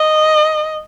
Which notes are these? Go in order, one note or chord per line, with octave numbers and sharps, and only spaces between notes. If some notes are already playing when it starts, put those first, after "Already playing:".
Already playing: D#5